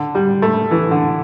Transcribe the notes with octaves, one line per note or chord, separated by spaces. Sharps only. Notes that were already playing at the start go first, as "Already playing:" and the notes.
Already playing: D3
G3
A3
E3
D3